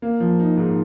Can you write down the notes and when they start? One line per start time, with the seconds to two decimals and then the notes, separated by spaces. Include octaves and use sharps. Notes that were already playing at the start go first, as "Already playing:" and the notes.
0.02 A#3
0.20 F3
0.39 D#4
0.57 G#2